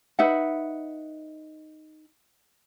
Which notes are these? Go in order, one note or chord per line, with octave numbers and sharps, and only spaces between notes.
D#4 B4 E5 F#5